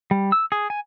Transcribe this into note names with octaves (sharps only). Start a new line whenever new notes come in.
G3
E6
G#4
G#5